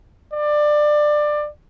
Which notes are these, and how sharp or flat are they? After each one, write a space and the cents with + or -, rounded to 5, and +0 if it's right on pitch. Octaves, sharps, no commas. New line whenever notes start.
D5 +20